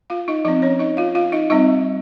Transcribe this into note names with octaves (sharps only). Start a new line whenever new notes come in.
F4 F5
D#4 D#5
F3 C4 D#4 D#5
C#4 C#5
D#4 D#5
F4 F5
F4 F5
D#4 D#5
G3 C4 D#4 D#5